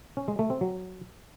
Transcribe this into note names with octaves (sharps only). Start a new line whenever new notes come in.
C#4
G#3
A3
C4
F#3